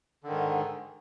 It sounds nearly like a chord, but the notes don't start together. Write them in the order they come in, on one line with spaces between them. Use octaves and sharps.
D3 D#3 G#2